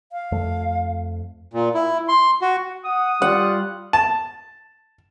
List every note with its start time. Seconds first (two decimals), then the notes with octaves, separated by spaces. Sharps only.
0.12 F5
0.32 F2 A3
1.53 A#2
1.74 E4
2.08 C6
2.42 F#4
2.85 F#5 D#6
3.22 G3 F4 F#5
3.93 A5